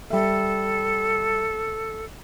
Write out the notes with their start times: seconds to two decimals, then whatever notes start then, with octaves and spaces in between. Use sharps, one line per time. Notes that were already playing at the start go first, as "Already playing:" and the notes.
0.10 G3 A4 E5